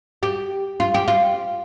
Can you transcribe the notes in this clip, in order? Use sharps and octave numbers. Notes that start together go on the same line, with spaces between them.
G4
F4
G4
F4